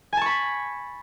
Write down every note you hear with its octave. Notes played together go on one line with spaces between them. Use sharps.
G#5 A5 B5 C#6